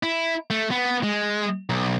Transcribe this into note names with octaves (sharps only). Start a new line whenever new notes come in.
E4
A3
B3
G#3
B1